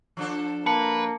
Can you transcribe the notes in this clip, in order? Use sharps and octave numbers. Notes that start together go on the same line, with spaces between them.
F3 D4 A4
A#3 B4 A5 C#7